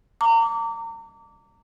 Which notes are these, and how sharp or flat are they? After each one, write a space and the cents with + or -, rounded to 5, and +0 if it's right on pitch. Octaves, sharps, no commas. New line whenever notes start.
A#5 -35 D6 -25